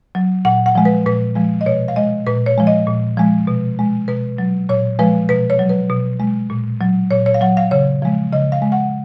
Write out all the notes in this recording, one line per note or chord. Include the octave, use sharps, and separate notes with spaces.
F#3
A#2 F#5
F#5
F3 G#3
B4
A#2 B4
F3 G#3
D#5
B2 C#5
F5
G#3 D#5
A#2 B4
C#5
F3 G#3
D#5
A#2
F3 G#3
B2
G#3
B2 B4
F#3
A#2 C#5
F3 G#3 B4
B2 B4
C#5
F#3
B4
B2
G#3
A#2
F#3
A#2 C#5
C#5
F5
F#3 F#5
F5
C#3 C#5
F3 G#3
C#3 D#5
F5
G#3
F#5